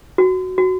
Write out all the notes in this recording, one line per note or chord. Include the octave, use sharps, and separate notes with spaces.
F#4
F#4